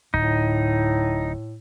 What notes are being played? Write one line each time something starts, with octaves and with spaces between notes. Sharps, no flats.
D1 A2 D#4